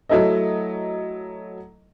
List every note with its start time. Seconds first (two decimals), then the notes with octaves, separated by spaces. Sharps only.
0.09 F#3 A3 E4 A4 D#5